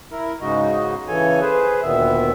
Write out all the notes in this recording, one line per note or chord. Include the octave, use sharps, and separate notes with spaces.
E4 A#4
G#2 C#3 G#3 D#4 F#4 D#5
C#3 E3 A4 C#5 G#5
G#4 B4 C5
D2 A#2 D#3 B3 E5